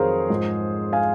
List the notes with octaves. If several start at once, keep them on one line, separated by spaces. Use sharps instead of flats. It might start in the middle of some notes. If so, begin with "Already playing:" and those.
Already playing: F2 D#3 F#3 G#4 A#4 C5 C#5 F5
G#2 F3
F5 G#5